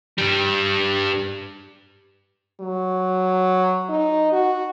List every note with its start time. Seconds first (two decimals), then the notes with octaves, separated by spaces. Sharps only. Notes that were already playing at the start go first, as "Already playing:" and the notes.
0.18 G2 G3
2.60 F#3
3.89 D#4
4.32 F#4